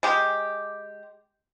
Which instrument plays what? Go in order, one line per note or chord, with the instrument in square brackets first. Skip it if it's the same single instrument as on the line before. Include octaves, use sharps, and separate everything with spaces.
[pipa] G#3 G4